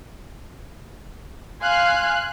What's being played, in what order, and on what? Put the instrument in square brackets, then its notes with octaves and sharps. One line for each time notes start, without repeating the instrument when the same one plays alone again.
[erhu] F5 [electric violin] G#5 C6 [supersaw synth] F#6